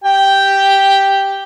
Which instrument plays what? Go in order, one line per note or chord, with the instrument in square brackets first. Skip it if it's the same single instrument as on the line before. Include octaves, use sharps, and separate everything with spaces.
[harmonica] G4 G5